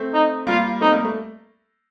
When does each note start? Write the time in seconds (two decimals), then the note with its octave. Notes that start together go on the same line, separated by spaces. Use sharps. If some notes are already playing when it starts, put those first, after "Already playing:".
Already playing: A3 C4
0.13 D#4
0.47 G3 A#3 F4
0.81 A3 C4 D#4
0.92 G3 A#3
1.05 A3